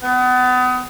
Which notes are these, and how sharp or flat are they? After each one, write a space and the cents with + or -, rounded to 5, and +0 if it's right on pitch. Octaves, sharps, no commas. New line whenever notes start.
B3 +30